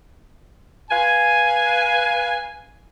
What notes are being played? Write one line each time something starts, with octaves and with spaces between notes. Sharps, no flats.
B4 F5 G#5